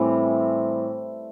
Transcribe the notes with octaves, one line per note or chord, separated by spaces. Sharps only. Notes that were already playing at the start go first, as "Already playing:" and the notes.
Already playing: A2 E3 G3 C4